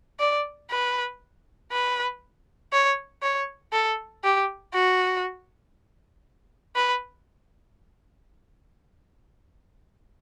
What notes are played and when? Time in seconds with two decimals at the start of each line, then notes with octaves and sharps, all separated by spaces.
0.20 D5
0.71 B4
1.72 B4
2.73 C#5
3.22 C#5
3.73 A4
4.24 G4
4.74 F#4
6.75 B4